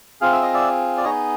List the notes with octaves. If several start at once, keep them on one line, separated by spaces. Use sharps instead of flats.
C4 F4 G#4 F5
E5
D#5
D5 E5
D5
B3 D#4 G#4 C#5 D#5